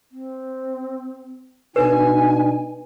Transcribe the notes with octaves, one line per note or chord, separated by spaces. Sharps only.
C4
B2 D4 D#4 B4 G#5